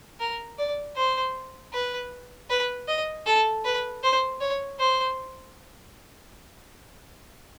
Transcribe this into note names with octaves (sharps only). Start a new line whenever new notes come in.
A#4
D5
C5
B4
B4
D#5
A4
B4
C5
C#5
C5